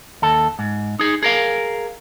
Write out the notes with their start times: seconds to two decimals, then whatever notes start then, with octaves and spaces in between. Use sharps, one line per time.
0.22 D#2 A4
0.59 G#2
0.99 D#4 G#4
1.23 G#4 A#4 F5